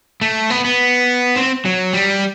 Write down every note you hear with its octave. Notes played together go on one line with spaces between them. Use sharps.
A3
B3
B3
C4
F#3
G3